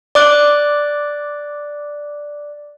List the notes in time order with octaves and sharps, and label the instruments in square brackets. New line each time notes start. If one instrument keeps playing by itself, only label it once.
[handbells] D5 D6 F#6